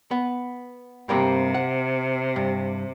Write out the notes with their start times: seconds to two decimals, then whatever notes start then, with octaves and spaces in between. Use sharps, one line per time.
0.11 B3
1.09 G2 C3 A#3 C4
1.54 F#5
2.36 G2